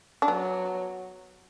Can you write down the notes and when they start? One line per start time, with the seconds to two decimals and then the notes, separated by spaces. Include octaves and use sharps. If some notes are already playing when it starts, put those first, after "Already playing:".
0.22 D4
0.28 F#3 B3